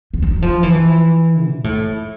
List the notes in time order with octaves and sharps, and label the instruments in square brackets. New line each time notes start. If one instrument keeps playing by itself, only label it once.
[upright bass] F3
F#3
F3
E3
A#2
A2